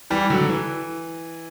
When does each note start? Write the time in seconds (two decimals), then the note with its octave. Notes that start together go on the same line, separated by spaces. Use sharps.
0.10 E3 G3
0.30 D3 F#3
0.49 E3